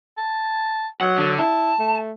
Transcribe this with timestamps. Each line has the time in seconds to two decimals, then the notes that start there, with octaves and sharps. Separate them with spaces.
0.17 A5
1.01 F#3 F#5
1.18 D3
1.39 E4 A5
1.79 A3